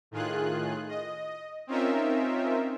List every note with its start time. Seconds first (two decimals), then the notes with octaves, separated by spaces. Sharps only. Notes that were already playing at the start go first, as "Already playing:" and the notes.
0.11 A2 D#3 F4 G#4 F#6
0.88 D#5
1.67 C4 C#4 D#4 F4 A#4 E5